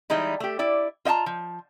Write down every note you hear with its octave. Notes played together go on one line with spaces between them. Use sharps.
E3 G3 G#3 D#4 E4
A3 G4
E4 D5
F4 D#5 F5 A5 A#5
F3